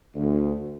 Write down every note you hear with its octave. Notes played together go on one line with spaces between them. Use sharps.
D2